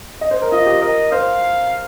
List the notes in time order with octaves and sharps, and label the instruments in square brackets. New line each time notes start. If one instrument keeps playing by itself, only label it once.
[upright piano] D#5
C5
A#4
[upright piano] F4 [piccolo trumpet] D#5
[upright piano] G4
[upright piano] A#4 [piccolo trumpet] D#5
[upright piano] C5 [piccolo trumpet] F5